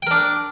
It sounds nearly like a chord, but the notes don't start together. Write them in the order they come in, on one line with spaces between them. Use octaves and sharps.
G5 A#4 D4